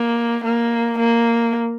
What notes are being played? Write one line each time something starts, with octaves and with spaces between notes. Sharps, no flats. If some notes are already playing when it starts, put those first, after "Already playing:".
Already playing: A#3
A#3
A#3